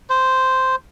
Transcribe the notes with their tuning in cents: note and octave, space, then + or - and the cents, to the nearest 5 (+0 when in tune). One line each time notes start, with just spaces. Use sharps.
C5 -5